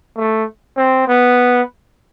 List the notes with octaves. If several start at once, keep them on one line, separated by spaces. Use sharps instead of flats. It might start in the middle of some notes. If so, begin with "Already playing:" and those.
A3
C4
B3